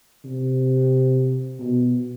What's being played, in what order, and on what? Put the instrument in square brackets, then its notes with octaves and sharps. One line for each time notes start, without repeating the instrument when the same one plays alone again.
[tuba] C3
B2